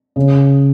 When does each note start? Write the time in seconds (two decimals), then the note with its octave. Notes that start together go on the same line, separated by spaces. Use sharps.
0.16 C#3